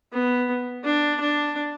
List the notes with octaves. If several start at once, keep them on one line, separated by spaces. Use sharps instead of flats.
B3
D4
D4